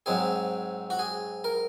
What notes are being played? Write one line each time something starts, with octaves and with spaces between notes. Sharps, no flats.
G#2 F#3 C4 G#4
F#4
G#4
A#4